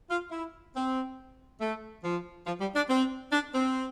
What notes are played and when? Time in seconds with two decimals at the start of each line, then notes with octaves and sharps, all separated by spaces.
0.10 F4
0.30 E4
0.75 C4
1.60 A3
2.03 F3
2.47 F3
2.61 G3
2.75 D4
2.89 C4
3.32 D4
3.54 C4